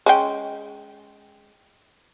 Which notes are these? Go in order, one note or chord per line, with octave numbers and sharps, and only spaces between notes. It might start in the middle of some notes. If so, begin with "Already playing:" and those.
G#3 C#4 G5